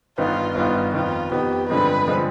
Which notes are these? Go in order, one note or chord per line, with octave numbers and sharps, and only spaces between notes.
G1 G2 D#3 B3 F4
G1 G2 D#3 B3 F4
F2 D#3 B3 F4
F2 D#3 B3 G4
G2 D3 F3 G#3 C4 B4
D3 F3 G#3 C4